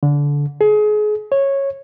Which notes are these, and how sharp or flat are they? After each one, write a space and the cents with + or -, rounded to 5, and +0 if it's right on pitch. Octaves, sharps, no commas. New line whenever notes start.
D3 -20
G#4 +30
C#5 -10